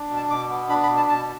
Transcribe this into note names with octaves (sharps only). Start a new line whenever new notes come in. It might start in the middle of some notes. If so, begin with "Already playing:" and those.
Already playing: D4
B2
A5
B2 D6
B3
D4 B5
B5
B2
A5
B2 A5